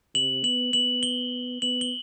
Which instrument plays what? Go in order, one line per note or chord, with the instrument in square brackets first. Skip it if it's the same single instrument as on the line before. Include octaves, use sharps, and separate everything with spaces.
[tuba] C3 [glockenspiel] F#7
[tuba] B3 [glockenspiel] F#7
[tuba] B3 [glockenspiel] F#7
[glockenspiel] G7
[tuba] B3 [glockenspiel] F#7
[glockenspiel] G7